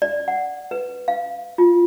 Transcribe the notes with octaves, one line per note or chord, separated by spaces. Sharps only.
D5
F#5
B4
F5
F4